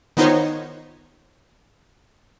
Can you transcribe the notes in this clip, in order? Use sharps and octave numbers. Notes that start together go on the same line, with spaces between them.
D#3 B3 D#4 F4 C5 C#5